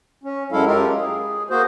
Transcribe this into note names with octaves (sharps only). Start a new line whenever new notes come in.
C#4
F#2 F#3 G#3 E4 A4 F5
G#3 F4 G4 A#4
G#4
A#3 F#4 G#4 C5